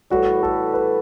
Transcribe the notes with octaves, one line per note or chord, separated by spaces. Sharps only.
A2 E3 G3 F#4
A4
B4